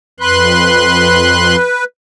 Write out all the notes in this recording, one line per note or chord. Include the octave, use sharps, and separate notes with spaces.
F2 B4 C6 F#6